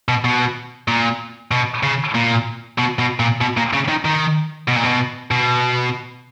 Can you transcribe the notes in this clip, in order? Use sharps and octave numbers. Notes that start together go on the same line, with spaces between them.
B2
B2
A#2
B2
C#3
A#2
B2
B2
A#2
B2
A#2
C#3
D#3
D#3
B2
A#2
B2
B2